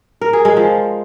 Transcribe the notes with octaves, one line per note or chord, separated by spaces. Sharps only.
A#4
G#4
G#3
F3